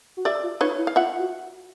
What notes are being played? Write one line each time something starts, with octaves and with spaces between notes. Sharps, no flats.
F#4
G4 D5 E5
F4
D#4 B4 C#5
E4
F5
F4 E5 F#5
F#4